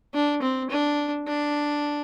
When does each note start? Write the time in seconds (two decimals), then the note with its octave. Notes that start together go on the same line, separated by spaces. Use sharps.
0.14 D4
0.42 C4
0.70 D4
1.27 D4